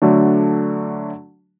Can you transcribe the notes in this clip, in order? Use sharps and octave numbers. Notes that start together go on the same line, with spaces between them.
D3 F#3 A3 D4